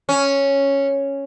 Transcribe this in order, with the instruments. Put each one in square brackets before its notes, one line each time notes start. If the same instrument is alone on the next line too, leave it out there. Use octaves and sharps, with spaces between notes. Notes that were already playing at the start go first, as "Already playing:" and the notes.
[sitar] C#4